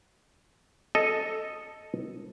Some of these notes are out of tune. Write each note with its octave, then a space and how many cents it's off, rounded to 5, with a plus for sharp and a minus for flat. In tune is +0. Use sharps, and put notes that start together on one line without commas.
A4 +0 D#5 +0